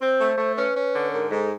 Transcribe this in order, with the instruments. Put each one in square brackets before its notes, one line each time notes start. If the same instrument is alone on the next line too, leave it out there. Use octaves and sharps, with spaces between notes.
[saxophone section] C4 [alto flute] C5
[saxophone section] A3
A3
[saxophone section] C#4 [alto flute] B4
[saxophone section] C#4
D3
[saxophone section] G#2 [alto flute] A#4
[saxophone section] G#2 [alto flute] A4